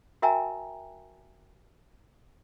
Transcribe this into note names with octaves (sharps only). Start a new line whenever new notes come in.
F#4 A#4 E5 G5 G#5 A#5